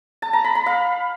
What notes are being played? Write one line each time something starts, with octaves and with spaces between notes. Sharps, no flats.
A5
A#5
B5
B5
F5